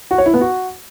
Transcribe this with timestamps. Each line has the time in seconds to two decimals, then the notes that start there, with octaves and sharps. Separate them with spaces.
0.11 F#4
0.18 C#5
0.26 E4
0.34 B3
0.41 F#4